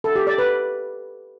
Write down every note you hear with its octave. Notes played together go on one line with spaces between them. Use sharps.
A4
G4
D5
B4